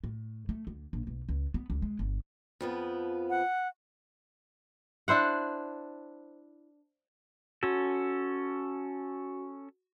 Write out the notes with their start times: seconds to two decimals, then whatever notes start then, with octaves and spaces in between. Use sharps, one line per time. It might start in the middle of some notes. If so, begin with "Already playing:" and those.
0.04 A2
0.49 A3
0.67 D2
0.93 A#1
1.07 B1
1.29 C#2
1.54 B3
1.70 C#2
1.82 G#3
1.99 G1
2.61 F2 F3 B3
3.30 F#5
5.08 D4 E4 C5 F#5
7.63 C#4 F#4 A4